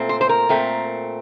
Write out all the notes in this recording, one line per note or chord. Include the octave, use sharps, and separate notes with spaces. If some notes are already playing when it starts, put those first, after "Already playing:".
Already playing: A#2 A3 C4
C5
C5
A#4
A#2 A3 C4